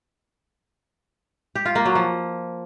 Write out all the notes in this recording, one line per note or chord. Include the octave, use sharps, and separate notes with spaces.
G4
F4
A#3
F#3
F3